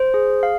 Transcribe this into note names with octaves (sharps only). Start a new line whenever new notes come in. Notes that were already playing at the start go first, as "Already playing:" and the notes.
Already playing: C5
G#4
F5